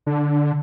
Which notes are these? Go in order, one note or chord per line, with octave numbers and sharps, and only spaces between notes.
D3